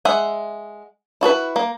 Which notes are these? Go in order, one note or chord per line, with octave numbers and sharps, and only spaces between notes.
G#3 E5 F#5
E4 F#4 A4 B4
A#3